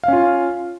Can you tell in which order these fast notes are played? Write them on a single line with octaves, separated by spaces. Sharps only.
F5 C#4 F4